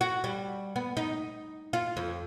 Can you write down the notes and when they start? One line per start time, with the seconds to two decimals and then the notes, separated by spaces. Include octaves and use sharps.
0.01 F#4
0.24 G3
0.76 B3
0.97 D#4
1.73 F4
1.97 F2